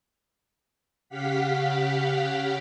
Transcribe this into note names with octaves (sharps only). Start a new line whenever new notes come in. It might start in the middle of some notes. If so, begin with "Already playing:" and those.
C#3 G4 F5 F#5 B6